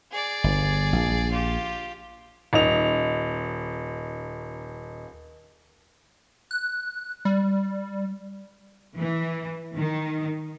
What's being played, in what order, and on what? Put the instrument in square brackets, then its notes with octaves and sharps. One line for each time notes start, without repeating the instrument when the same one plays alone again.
[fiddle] G#4 D5
[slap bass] G1
A#1
[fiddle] F4 G4
[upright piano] D#1 D#4 F7
[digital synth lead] F#6
G3
[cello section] E3
D#3